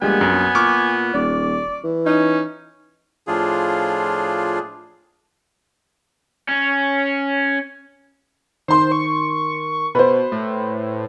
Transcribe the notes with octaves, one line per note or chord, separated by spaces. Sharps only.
A#1 G3 G#3 A#3 B3 G#5
F#2
A#2 C#6 D6 F6
D#1 D5
E3
C#4 D#4
A2 F3 D4 F4 G#4
C#4
D#3 C5 C6
C#6
B2 B4 C5
A2